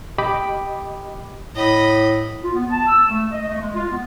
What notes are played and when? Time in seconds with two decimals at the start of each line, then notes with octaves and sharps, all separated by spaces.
0.18 G4 D#5 G5 B5 D6
1.55 A2 D#5 B5
2.43 F4
2.54 B3
2.70 A5
2.87 E6
3.08 A3
3.32 D#5
3.48 A3
3.61 G#3
3.75 F4
3.90 B3